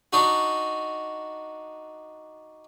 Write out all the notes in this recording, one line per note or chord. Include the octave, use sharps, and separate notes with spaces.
D4 D#4 F#4